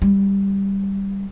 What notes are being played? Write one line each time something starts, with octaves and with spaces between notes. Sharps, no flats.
G3